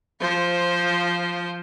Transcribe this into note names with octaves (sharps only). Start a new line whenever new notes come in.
F3 C5